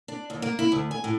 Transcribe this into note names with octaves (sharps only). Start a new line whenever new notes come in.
D4
D#2
A#3
E4
D2
G#5
A2